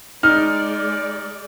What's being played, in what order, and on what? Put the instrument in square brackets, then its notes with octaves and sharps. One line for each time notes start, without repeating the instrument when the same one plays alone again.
[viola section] G#3 D5 [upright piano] D#4 [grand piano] F6